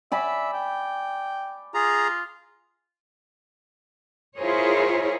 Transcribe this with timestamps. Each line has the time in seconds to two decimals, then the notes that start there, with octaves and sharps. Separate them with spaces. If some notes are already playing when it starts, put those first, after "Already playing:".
0.12 D5 E5 G#5 B5
0.53 G5
1.74 F4 G#4 A#5
4.38 E4 F4 G#4 A#4 C5 C#5